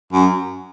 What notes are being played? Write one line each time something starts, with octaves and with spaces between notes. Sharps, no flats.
F#2